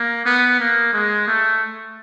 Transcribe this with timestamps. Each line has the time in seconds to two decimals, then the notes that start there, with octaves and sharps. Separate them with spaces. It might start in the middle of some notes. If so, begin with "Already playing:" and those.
Already playing: A#3
0.25 B3
0.60 A#3
0.93 G#3
1.28 A3